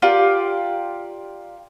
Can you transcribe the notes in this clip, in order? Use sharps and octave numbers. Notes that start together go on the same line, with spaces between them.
F4 G4 A#4 D5